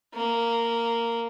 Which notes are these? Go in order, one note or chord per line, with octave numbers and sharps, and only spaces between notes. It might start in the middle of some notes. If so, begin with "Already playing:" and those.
A#3